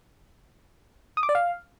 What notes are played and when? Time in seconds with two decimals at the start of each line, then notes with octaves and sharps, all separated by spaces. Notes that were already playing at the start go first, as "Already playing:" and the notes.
1.17 D#6
1.23 D6
1.29 D5
1.35 F5